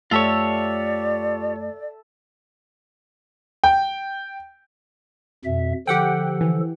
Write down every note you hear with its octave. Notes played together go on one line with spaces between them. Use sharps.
F#2 A3 F4 G4 A4 C#5 D5 E5
G5
F2 B2 E5
D3 F3 G4 A4 F#5 G5
E3